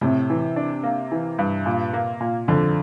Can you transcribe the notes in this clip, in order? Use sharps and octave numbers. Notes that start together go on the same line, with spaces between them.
A2 C3
E3
D4
A#3
E3
G2
A#2
A#3
A#2
F2 D3